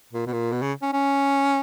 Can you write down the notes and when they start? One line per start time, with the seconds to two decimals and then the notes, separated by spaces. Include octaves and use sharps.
0.13 A#2
0.26 B2
0.33 A#2
0.52 B2
0.62 C#3
0.82 C#4
0.93 C#4